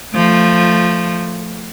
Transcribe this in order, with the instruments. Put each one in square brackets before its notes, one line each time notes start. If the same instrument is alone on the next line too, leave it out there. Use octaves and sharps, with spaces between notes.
[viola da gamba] F3 A3